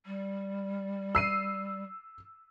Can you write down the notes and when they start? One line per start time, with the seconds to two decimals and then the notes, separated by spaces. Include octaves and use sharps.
0.06 G3
1.15 E6 C7 D#7